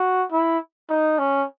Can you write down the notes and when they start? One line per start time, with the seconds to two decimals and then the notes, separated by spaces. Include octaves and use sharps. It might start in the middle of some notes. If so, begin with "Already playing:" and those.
Already playing: F#4
0.32 E4
0.90 D#4
1.19 C#4